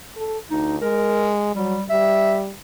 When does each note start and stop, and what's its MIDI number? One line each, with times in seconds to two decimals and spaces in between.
0.17 0.38 69
0.51 0.81 38
0.51 0.76 63
0.82 1.53 56
0.82 1.31 70
1.56 1.78 54
1.56 1.83 55
1.90 2.51 55
1.90 2.39 76